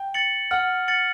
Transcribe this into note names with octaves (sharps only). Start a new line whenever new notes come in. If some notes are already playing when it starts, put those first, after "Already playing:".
Already playing: G5
A6 C#7 F#7
F#5 F6
A6 C#7 F#7